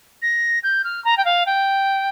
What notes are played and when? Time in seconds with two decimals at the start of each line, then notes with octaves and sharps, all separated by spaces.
0.22 A#6
0.64 G6
0.84 F6
1.05 A#5
1.17 G5
1.25 F5
1.46 G5